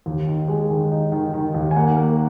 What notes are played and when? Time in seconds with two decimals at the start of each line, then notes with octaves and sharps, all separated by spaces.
0.06 D#2
0.27 D#3
0.48 G#3
0.70 D#3
0.92 D#4
1.12 D#3
1.34 D#3
1.54 D#2
1.71 G#5
1.76 A#3 F#5
1.97 A#3